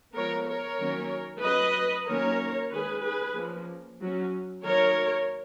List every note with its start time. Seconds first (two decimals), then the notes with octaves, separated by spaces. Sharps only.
0.14 F3 G#3 B3 A#4 C#5
0.47 A#4 C#5
0.79 D#3 F#3 A#3 C#4
1.43 F#3 C#4 B4 D#5
2.07 D#3 F#3 A#3 C#4 A#4 C#5
2.72 D#3 G#3 C#4 G#4 B4
3.04 G#4 B4
3.36 F3 A#3 C#4
4.01 F#3 C#4
4.65 D#3 F#3 A#3 A#4 C#5